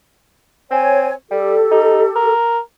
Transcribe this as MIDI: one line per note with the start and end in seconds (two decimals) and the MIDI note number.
0.71 1.11 60
0.71 1.12 73
0.71 1.12 80
1.31 1.57 55
1.31 2.32 67
1.31 2.32 69
1.71 2.02 63
2.16 2.59 70